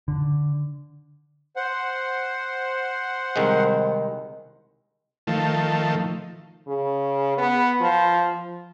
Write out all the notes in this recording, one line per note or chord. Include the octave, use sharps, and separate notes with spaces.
D3
C5 F#5
C2 D#3 G#3
D#3 F3 A3
C#3
B3
F3